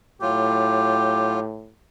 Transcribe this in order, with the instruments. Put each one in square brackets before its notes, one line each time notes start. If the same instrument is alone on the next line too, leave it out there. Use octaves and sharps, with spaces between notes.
[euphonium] A2 [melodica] F#3 F4 [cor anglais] G4